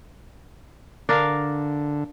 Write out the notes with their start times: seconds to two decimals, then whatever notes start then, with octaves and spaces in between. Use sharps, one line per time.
1.09 D3 D4 A#4 F5